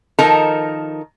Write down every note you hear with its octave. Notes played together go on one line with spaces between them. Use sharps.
D#3 F3 D#4 A4 A#4 A#5